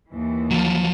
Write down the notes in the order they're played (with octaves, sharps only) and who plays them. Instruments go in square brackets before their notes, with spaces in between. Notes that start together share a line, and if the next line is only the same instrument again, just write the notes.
[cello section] D#2 E3
[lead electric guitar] F3 F#3